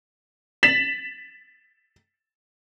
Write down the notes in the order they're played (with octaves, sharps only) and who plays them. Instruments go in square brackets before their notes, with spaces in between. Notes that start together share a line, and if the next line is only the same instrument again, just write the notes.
[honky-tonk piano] A6 B6 E7 F#7